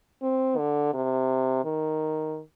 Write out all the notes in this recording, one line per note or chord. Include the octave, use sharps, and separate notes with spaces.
C4
D3
C3
D#3